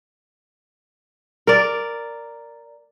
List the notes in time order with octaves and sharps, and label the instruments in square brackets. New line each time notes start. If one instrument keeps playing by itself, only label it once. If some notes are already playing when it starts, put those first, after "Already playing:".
[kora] A#4 D5